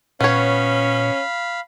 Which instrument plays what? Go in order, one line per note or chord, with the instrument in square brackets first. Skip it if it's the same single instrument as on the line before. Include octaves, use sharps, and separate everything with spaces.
[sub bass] A#2 [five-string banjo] B3 C#5 [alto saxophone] C#4 [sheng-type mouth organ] F5 B5